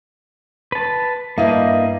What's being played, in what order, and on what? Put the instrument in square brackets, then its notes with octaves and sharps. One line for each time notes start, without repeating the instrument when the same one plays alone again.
[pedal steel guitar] B4 A5
[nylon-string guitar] G2 E4 F5 [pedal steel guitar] A#3 D#5